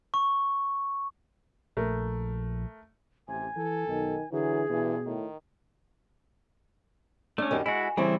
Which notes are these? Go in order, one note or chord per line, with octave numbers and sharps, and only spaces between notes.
C#6
A#1 A3 A#4
A1 C3 G#5
E3 A4
B1 D#3
D3 E3 F#3 G#4
G2 B2 E3
A2 D#3
A3 C#4 D4
F#2 D#3 G3
G#3 E4 F#4
C#3 E3 G3 C4 E4